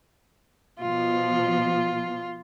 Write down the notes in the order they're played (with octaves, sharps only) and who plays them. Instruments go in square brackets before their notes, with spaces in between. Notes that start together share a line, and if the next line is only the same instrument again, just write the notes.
[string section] B2 F3 [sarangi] F4